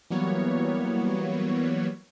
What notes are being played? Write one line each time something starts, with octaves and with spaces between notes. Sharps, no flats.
E3 F#3 G3 A#3 B3 C#5